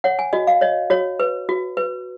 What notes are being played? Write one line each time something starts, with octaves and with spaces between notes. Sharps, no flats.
C#5 F#5
G#5
F#4 D#5
F5
C#5 D#5
F#4 C#5
B4
F#4
B4